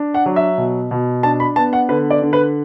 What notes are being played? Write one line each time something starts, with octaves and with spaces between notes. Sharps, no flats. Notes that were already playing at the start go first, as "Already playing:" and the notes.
Already playing: D4
F#5
F#3
E5
B2
B2
D4 A5
B5
B3 A5
F#5
D3 B4
D5
D3
B4